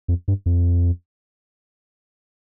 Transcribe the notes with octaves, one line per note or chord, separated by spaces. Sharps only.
F2
G2
F2